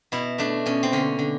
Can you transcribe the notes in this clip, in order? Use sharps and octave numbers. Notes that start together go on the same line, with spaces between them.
B2 E4
A3 D4
B2 C#4
C4
D3 C#4
D3